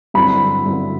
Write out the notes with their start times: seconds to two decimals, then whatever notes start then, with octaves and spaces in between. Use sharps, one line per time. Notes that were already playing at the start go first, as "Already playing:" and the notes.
0.14 G2 D3 F#3 C4 E4 B5
0.65 G2 D3 F#3 C4 E4